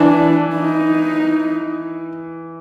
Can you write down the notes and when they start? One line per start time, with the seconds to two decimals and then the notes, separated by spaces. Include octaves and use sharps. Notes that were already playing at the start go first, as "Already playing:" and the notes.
Already playing: E3 D4
0.55 D#4